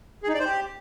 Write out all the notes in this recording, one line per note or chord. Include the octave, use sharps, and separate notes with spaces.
G#4
D#4
D5
C5
G4